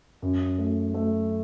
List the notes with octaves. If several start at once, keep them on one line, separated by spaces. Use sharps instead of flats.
F#2
A3
A3